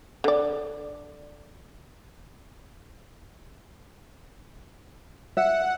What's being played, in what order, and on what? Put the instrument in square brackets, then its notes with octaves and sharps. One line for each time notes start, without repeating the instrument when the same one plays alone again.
[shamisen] D3 D5
[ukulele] E5 [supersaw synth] F#5